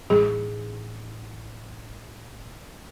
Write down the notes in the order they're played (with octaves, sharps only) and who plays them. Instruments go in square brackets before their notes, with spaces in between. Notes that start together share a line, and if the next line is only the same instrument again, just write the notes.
[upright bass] A1 D#4 [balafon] G#4